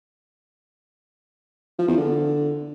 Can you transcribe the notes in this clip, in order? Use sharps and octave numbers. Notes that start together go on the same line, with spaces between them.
F3
E2
D3